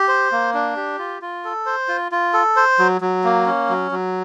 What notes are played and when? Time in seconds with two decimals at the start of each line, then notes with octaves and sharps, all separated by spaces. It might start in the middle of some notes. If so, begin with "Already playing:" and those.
Already playing: G4
0.08 C5
0.32 A#3
0.54 D4
0.76 G4
0.99 F4
1.22 F4
1.45 A4
1.66 C5
1.88 F4
2.12 F4
2.33 A4
2.57 C5
2.79 F#3
3.01 F#3
3.24 A#3
3.46 C#4
3.69 F#3
3.91 F#3